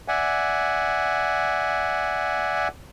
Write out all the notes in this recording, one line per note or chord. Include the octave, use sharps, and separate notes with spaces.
D5 E5 F#5 G#5